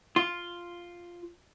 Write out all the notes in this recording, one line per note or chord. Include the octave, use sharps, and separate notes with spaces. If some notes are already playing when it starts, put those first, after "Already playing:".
F4